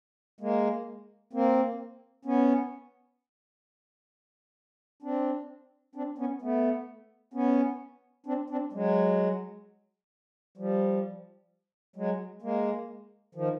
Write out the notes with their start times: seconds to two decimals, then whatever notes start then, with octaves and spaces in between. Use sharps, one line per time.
0.41 G#3 A#3
1.33 A#3 C4
2.25 B3 C#4
5.03 C4 D4
5.95 C4 D4
6.18 B3 C#4
6.42 A3 B3
7.34 B3 C#4
8.26 C4 D4
8.50 C4 D4
8.73 F#3 G#3
10.58 F3 G3
11.96 F#3 G#3
12.42 G#3 A#3
13.35 D#3 F3